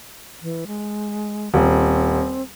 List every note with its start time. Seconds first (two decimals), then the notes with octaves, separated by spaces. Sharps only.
0.42 E3
0.67 G#3
1.54 D#1 C4